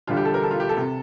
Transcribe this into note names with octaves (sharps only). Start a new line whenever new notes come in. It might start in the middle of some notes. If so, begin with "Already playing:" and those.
E1 D2 D3 G3 F4
G4
A4
A#4
A4
F4
G4
A4
C3